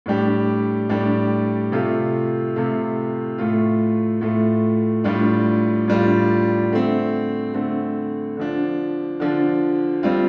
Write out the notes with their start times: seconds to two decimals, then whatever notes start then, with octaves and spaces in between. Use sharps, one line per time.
0.06 A2 G3 D4 G4
0.89 A2 G3 D4 G4
1.72 C3 A3 F4
2.56 C3 A3 F4
3.38 A2 A3 F4
4.21 A2 A3 F4
5.04 A2 G3 D4 F4
5.88 A2 G3 D4 F4
6.72 D3 A3 C4
7.54 D3 A3 C4
8.37 D3 F3 D4
9.20 D3 F3 D4
10.03 G3 C4 F4